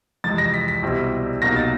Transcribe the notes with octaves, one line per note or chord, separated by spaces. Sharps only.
F2 C3 E3 G#3 A6
A#6
B6
B6
C2 B2 G3 C4 E4
C2 B2 F#3 A#3 D#4 A#6
A6